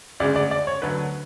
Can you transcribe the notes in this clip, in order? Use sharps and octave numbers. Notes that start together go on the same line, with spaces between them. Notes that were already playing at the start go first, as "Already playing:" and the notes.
D2 C#3 G#3 D5
D5
D5
C#5
D2 D3 F#3 B4